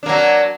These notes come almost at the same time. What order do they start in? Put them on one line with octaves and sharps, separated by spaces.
D4 A#3 F#3